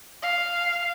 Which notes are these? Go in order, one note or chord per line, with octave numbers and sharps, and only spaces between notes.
F5